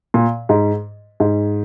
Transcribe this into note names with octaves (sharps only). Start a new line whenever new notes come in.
A#2
G#2
G#2